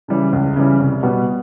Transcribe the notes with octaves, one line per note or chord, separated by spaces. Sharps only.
C#3 E3 G3
C#2
C#3 E3 G3
C2
B2 G3 B3